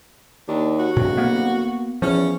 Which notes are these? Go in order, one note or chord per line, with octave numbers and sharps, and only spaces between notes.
D#2 D4
F#4
D1 G2 B2
A#3 B3
E2 F3 C#4